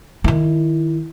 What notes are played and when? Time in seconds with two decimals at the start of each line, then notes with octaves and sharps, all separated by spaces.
0.24 D#3 E4